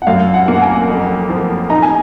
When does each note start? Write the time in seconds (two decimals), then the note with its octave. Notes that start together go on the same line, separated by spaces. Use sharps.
0.02 F#5
0.07 F#2 F5
0.34 F#5
0.48 A#3
0.55 F#5
0.62 G#5
0.88 F2
1.30 F3
1.70 D#4 A#5
1.82 G#5